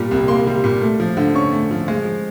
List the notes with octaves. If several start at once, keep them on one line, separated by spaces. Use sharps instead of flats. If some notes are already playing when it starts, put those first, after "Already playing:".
Already playing: A#2 G3
C2
A#3 C6
G3
A#2
A3
F3
D3
C#4 C#6
A3
F3
G#3
F3